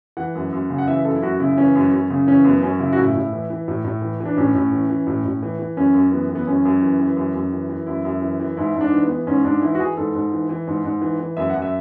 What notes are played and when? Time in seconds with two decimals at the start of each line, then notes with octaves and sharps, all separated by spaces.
0.17 E3 F#5
0.35 F#2
0.52 F#2
0.70 C#3
0.78 F#5
0.88 E3 E5
1.05 F#2 A4
1.16 E4
1.22 F#2 F#4
1.40 C#3 E4
1.57 E3 C#4
1.75 F#2
1.93 F#2
2.10 C#3
2.27 E3 C#4
2.44 F#2 B3
2.62 F#2 C#4
2.80 C#3 E4
2.93 F#4
2.97 A2 E4
3.15 A2
3.33 E3
3.50 E3
3.68 A2
3.85 A2
4.02 E3
4.20 E3
4.25 D4
4.37 A2 C#4
4.55 A2
4.72 E3
4.90 E3
5.07 A2
5.25 A2
5.43 E3
5.59 E3
5.77 F#2 C#4
5.94 F#2
6.12 E3 B3
6.29 E3
6.35 B3
6.47 F#2 C#4
6.65 F#2
6.82 E3
7.00 E3
7.17 F#2
7.34 F#2
7.52 E3
7.69 E3
7.87 F#2 E4
8.05 F#2
8.22 E3
8.40 E3
8.57 G#2 E4
8.75 G#2
8.81 D4
8.92 E3
9.04 B3
9.09 E3
9.27 G#2 C#4
9.45 G#2 D4
9.62 E3 E4
9.75 F#4
9.80 E3 G#4
9.97 G#2 A4
10.15 G#2
10.32 E3
10.49 E3
10.67 G#2
10.84 G#2
11.01 E3
11.20 E3
11.37 F#2 E5
11.50 F#2 F#5
11.62 E5